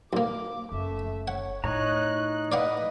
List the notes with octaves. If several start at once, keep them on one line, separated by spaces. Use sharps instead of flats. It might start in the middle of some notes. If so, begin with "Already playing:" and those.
B1 A#3 D6
F#1 A3 E5
C#5 F#5
A2 D#4 C#5 A#5 F#6
B4 D5 D#5 F5 F#5